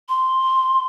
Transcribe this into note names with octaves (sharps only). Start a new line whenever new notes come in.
C6